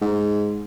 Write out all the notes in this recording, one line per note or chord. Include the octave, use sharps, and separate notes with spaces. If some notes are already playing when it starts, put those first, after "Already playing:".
G#2